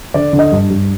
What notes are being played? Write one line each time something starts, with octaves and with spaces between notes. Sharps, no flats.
D3 D5
D3
D#5
G2
G2